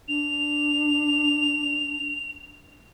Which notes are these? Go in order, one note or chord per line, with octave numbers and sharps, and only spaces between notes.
D4 F7